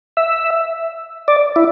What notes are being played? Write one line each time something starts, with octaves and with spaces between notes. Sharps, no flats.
E5
D5
E4